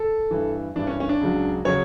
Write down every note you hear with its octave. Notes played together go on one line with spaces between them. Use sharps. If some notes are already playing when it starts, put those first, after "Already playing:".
Already playing: A4
G2 E3
G2 E3 D4
C#4
C#4
D4
C#2 C#3 F#3
C#3 F#3 C#5